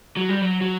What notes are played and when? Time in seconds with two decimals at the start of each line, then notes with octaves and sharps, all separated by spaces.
0.17 F#3
0.29 G3
0.41 F#3
0.61 F#3